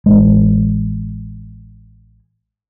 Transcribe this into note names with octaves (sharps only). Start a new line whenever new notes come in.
A1 G#3